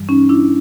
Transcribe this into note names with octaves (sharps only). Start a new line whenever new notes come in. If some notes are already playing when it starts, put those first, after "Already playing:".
Already playing: G2 E3 G3
C#4 D#4
D4 E4